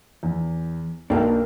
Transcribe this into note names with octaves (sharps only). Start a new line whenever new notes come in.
E2
B1 A#3 D4 G5